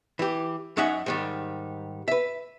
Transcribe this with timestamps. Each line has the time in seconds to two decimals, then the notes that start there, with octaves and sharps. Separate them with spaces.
0.19 E3 G4
0.77 F#2 C#4 D#4 E5 F#5
1.06 G#2 D#3 G3
2.08 B4 E5